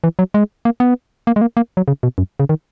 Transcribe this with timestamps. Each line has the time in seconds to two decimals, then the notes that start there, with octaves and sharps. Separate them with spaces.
0.04 E3
0.19 F#3
0.34 G#3
0.65 A#3
0.80 B3
1.27 A#3
1.36 G#3
1.41 A#3
1.57 A#3
1.77 F#3
1.88 C#3
2.03 B2
2.18 F#2
2.40 C#3
2.49 D#3